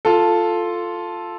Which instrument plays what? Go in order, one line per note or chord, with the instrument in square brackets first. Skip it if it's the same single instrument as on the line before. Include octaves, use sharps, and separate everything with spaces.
[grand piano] F4 A4